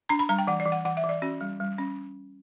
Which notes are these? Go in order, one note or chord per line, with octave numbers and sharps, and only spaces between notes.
D4 A#5
B5
G3 A#5
G5
E3 F#5
D5
E3
F#5
E3 F#5
E5
E3
D5
C#4 F#4
G3
G3
C#4